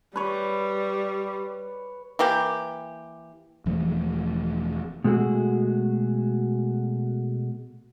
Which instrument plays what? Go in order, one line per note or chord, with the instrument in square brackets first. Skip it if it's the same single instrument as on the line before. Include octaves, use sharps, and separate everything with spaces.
[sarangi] G3 [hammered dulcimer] B4 C#5
[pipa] E3 A#3 G4
[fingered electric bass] E1 E3 F3 A3
[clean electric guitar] B2 G#3 A3 B3 F#4 G#4